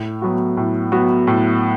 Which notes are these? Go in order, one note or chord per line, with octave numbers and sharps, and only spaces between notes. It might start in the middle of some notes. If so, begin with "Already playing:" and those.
Already playing: A2
F#3 B3 F#4
A2
F#3 B3 F#4
A2